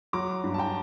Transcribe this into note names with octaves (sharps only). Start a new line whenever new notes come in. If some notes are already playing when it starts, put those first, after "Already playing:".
F#3 A#5 D6
G2
A5
G5 A#5